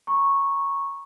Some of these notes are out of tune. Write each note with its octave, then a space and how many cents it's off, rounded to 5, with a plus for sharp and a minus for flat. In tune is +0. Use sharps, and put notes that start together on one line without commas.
A#5 +15 C#6 -10